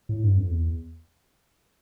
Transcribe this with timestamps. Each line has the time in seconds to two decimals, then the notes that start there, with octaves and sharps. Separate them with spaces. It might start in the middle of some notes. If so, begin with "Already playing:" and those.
0.09 A2
0.24 G2
0.37 F2
0.51 E2